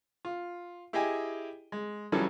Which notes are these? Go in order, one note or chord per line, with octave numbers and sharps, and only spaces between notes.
F4
E4 G4 G#4 D#5 G5 G#5
G#3
C#2 E3 F#3 G3 C#4 A4